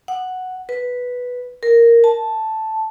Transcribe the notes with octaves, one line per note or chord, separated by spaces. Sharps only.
F#5
B4
A#4
A5